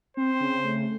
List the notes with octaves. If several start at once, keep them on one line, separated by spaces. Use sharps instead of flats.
C4 C5
C#3
A3